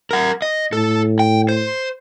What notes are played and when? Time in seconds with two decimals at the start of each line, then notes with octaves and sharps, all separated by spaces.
0.11 A#4 F#5
0.42 D#5
0.73 A2 A4
1.19 G5
1.49 C5